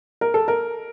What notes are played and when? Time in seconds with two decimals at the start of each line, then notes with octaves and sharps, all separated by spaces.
0.21 A#4
0.34 A4
0.48 A#4